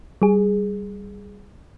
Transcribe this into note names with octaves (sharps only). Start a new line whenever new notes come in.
G3 G#4